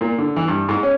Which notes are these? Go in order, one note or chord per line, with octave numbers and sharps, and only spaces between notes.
A#2
D3
E3
G2
G#2
C#4